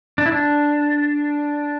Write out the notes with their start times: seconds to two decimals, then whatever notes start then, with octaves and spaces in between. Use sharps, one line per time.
0.18 D4
0.26 E4
0.32 D4